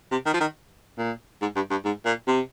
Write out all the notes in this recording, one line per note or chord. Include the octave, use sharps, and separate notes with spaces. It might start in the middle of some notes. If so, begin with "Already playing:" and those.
C3
D#3
F3
D#3
A#2
G#2
G2
G2
G#2
A#2
C3